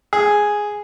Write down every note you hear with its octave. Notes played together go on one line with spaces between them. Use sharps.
G#4